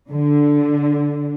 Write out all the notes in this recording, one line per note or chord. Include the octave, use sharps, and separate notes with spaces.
D3